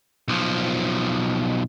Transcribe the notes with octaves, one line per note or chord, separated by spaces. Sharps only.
B1 F3